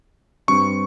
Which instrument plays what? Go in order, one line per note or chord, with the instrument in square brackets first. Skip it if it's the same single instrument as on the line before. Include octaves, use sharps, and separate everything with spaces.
[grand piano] G2 G3 C4 [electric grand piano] C#6